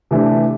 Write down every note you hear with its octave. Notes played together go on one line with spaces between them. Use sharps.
C3 E3 A3 D4